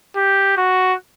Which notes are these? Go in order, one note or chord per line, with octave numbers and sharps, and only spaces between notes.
G4
F#4